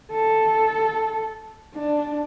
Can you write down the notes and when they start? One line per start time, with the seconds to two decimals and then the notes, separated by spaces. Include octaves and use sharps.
0.12 A4
1.75 D4